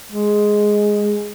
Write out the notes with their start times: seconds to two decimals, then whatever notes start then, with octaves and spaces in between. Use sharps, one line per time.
0.12 G#3